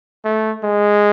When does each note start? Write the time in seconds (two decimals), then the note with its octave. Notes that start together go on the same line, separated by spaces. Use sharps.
0.25 A3
0.64 G#3